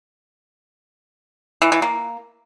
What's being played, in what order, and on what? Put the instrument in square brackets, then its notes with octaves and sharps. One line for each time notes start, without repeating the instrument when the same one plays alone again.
[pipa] E3
E3
A#3